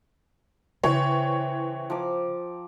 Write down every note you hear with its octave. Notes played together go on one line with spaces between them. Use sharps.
C#3 E3 C5 C#5 G5
F3 A#5 D6